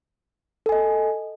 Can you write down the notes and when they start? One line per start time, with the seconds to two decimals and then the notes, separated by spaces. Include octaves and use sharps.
0.66 A4
0.69 G#5
0.72 D#5